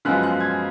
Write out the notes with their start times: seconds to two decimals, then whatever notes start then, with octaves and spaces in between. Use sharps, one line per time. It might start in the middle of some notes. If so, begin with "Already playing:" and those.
0.05 F#2 C#3 F3 G#3 B3 F#6
0.23 F#6
0.40 G#6